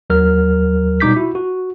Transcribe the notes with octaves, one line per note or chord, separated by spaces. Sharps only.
D#2 F#3 A#4 F6
B2 G3 D#4 D6 G6 B6
E4 F#4
F#4